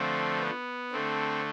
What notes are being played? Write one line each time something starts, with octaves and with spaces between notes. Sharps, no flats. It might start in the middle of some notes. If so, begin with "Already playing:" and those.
Already playing: D3 F3 A3 C4
B3
D3 A3 C4